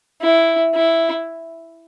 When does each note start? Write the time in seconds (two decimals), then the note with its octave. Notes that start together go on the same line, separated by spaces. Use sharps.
0.22 E4
0.74 E4